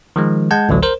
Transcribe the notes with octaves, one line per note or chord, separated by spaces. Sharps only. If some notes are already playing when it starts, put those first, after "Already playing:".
D#3 F3 G#3
G#3 F#5 A5 G6 G#6
A1 D2 D3 F#3
A#4 C5